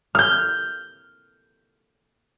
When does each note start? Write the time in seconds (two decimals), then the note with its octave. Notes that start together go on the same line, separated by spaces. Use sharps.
0.15 F6 G6